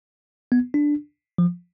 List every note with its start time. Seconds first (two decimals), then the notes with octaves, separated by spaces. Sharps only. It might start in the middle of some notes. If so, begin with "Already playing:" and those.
0.52 B3
0.74 D4
1.38 F3